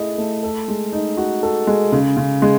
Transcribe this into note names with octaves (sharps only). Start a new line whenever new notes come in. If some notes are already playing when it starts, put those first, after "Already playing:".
Already playing: A3 E4 G#4 D#5
A3
A4
G#3
D#4
F#4
A4
G#3
C#3
C#3
G#3